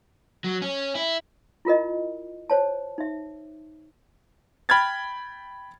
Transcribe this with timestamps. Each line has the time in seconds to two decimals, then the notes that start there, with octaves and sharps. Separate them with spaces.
0.44 F#3
0.62 C#4
0.95 E4
1.65 E4 F4 A#4 D#5
2.50 C5 C#5 A5
2.98 D#4 E5
4.69 G5 B5 F6 G#6 A6